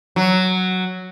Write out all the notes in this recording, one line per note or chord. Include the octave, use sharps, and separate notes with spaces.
F#3